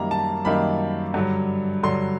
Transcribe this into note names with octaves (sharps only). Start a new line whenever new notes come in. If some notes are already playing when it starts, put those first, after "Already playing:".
Already playing: F#2 D#3 G3 A#3 A#5
A5
F#2 D#3 G3 A#3 B5
G2 D3 F#3
G2 D3 F#3 C6